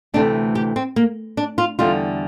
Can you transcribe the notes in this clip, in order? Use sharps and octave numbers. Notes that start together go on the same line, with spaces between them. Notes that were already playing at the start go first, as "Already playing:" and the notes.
D2 C3 E3 A3 D4
G4
C4
A#3
D4
F4
E2 D3 G3 F4